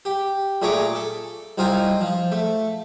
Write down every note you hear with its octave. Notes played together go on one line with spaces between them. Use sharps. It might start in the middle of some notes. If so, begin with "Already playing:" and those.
G4
A#2 A3 G#4 C#5 A#5 D6
A4
C2 C4 D#4 F4 G#5
F3
A3